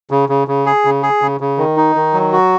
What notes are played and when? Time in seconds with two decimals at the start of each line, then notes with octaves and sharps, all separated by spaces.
0.11 C#3
0.29 C#3
0.48 C#3
0.66 G#4
0.85 C#3
1.03 G#4
1.22 C#3
1.40 C#3
1.58 D#3
1.77 D#4
1.96 D#3
2.14 F#3
2.32 F#4